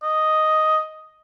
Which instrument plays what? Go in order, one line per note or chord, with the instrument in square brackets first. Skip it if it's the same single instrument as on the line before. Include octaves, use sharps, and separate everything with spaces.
[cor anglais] D#5